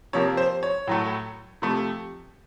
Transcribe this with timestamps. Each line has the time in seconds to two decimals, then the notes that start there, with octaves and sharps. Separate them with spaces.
0.13 C3 F3 A#3 C#5
0.37 C5
0.63 C#5
0.87 A2 F#3 A3
1.62 C3 F3 A3